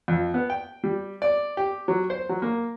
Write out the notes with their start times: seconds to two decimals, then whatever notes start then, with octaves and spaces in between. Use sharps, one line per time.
0.08 F2
0.34 B3
0.50 G5
0.84 G3
1.22 D5
1.57 G4
1.88 F#3
2.10 C5
2.29 F#3
2.42 A#3